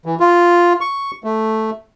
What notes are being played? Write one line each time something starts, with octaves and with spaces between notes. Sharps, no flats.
E3
F4
C#6
A3